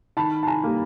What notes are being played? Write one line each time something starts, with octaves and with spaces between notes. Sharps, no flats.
D#3 A5 B5
A5
G#5 A#5
G3 A#3